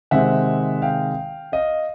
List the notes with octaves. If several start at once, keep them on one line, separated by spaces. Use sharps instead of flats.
C3 D#3 G#3 C4 E5 F#5
F5 G5
D#5 F5